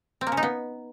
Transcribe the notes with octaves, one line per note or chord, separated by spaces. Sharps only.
C4
A#3
C#3
D#4
B3